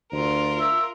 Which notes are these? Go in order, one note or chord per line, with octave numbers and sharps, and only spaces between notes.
D2 F4 A#4
E5